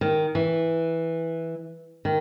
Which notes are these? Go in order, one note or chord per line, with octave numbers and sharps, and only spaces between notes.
D#3
E3
D#3